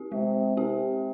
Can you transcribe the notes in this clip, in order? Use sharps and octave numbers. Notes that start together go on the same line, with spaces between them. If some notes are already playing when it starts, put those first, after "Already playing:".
Already playing: C4 G4
C3 G#3
C3 C4 G4